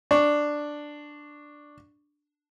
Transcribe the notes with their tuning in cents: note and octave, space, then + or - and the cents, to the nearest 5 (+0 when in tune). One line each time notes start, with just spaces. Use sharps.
D4 +5 C#6 +0